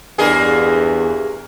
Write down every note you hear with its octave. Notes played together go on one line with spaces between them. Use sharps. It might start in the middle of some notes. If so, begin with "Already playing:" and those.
E2 G2 A#3 G#4